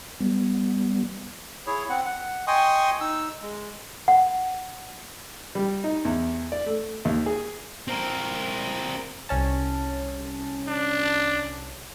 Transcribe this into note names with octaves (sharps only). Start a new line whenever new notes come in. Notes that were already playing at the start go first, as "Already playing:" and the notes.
G3 B3
E4 G#4 C#5
C4 F#5
F#5
D#5 G5 G#5 C6 C#6 D#6
D#4 E6
G#3
F#5
G3
D#4
E2
D5
A3
D#2
G#4
C4 A#4
C2 C#4 A5
D4